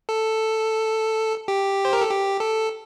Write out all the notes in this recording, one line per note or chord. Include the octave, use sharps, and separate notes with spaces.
A4
G4
C5
A#4
A4
G4
A4